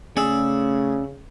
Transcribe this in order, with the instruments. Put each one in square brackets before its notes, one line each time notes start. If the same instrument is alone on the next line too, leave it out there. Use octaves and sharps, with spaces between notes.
[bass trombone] C#3 [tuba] A3 [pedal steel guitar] C#4 D5 E6 [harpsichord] G#4